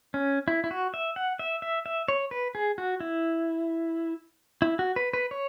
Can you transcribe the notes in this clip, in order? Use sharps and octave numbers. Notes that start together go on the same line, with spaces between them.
C#4
E4
E4
F#4
E5
F#5
E5
E5
E5
C#5
B4
G#4
F#4
E4
E4
F#4
B4
B4
C#5